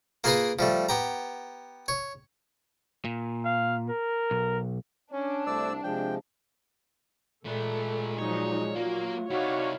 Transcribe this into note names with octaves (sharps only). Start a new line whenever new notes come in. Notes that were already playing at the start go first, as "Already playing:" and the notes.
A#3 F4 G#4 A#4 B4 F5
F3 G3 A3
B3 G4 A#5
C#5
A#2
F5
A#4
B1
C#4 D4
C2 A3 C5 D5 E6
C3 F3 G#3 G5
A#2 G#3 A3 A4 B4
F3 F#3 D#4 C#5
F#3 A#3 F4 A#4
C3 D#4 E4 F#4 C#5 D5 F5